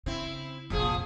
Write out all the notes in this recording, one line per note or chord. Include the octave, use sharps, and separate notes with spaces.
C#3 C4 E4
F1 A#1 A#2 F3 G#4